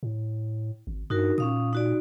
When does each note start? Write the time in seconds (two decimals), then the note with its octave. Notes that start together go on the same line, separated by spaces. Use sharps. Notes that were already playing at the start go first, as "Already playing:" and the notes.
0.03 A2
0.87 G#1
1.10 G2 D#4 F#4 A#4
1.38 A#2 C#4 F5 D#6
1.73 D#4 F#4 D5